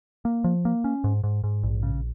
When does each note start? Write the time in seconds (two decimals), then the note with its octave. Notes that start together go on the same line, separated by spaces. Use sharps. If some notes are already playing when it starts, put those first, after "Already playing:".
0.25 A#3
0.44 F3
0.65 A#3
0.84 C#4
1.04 G#2
1.24 G#2
1.44 G#2
1.63 A#1
1.83 C#3